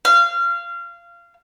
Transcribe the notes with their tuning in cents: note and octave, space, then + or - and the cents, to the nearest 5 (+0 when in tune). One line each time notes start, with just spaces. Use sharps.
F5 -25